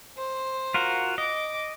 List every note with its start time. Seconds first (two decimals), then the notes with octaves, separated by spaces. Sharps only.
0.17 C5
0.74 F4 F#4 A#4
1.18 D#5 D6